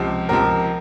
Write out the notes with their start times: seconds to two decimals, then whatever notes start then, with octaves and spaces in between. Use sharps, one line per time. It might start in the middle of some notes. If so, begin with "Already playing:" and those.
Already playing: C#2 C3 F3
0.29 C#2 C3 F3 A#4